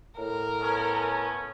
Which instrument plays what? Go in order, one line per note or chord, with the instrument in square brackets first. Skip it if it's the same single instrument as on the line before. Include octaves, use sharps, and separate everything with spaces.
[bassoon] A2 [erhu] A#4
[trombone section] A3 B3 C#4